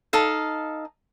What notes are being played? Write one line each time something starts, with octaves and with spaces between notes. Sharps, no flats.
D#4 A4 F5